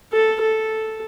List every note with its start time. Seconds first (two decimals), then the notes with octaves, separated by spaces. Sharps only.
0.12 A4
0.41 A4